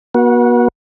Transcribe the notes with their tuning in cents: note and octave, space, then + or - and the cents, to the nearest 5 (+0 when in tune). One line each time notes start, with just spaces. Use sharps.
B3 -45 F#4 -10